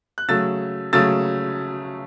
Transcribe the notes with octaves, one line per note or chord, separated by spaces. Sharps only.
F#6
C#3 F#3 A3 E6 A6
C#3 F#3 A3 E6 A6